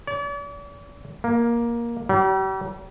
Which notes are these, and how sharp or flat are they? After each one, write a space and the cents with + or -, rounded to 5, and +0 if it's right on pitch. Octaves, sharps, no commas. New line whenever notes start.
D5 -45
A#3 +10
G3 -40